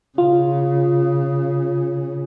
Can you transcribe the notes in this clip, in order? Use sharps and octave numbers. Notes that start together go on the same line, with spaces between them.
C#3 F4